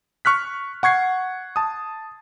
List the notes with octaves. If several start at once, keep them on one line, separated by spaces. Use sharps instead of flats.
C#6 F6 F#6 B6
F#5 C#6 G#6 C7
A5 D#6